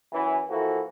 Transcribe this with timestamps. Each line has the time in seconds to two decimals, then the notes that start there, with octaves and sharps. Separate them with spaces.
0.13 F#2 E3
0.50 E3 F3 A#3 E4 F#4 A4